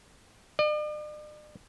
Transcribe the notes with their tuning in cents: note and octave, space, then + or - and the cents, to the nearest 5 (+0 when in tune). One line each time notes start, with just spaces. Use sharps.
D5 +45